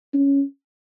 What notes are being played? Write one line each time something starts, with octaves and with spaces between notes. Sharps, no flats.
C#4